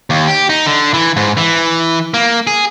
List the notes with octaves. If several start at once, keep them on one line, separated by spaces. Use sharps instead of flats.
D#2
G4
D#4
D3
E3
G#2
E3
A#3
G#4